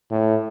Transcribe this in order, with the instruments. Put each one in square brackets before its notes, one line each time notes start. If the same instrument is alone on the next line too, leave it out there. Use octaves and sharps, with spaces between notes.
[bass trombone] A2